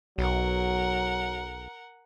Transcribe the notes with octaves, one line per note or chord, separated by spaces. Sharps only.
B1 F#3 A#4 F#5